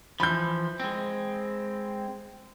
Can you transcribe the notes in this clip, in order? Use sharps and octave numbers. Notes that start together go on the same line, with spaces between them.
E3 F3 B5 G6
G#3 C4